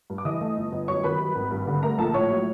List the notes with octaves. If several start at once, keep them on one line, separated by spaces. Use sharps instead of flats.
G2
D6
E3 D#5 D#6
A3
G1
G1
F#2 C#5 C#6
D#3 B4 B5
G3
G#1
G2
D3
A3 A#4 A#5
A#1 A4 A5
A2 C#5 C#6
F#3